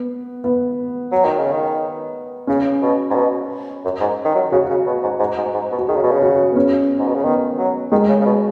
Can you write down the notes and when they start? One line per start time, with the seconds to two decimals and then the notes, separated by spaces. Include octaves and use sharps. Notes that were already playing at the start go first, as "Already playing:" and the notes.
Already playing: B3
0.44 B3
1.12 F#3
1.25 D#3
1.38 C#3
1.52 D#3
2.47 C#3 C#4
2.82 B2
3.10 G#2
3.15 B2
3.84 F#2
4.00 G#2
4.25 D#3
4.35 F#3
4.52 C#3 F#4
4.69 C#3
4.86 B2
5.02 G#2
5.19 G#2
5.37 G#2
5.54 G#2
5.71 B2
5.79 F#4
5.88 D#3 G#4
5.96 C#3
6.03 B2
6.11 C#3
6.22 F#4
6.52 B3
6.56 C#4
6.99 G#2
7.08 B2
7.15 C#3
7.24 D#3 B3
7.58 F#3
7.91 D#3 G#3
8.09 C#3
8.21 C#3
8.25 B2